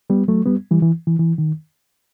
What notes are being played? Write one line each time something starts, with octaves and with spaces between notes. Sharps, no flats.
G3 B3
F#3 A3
G3 B3
E3 G3
E3
E3
E3
D#3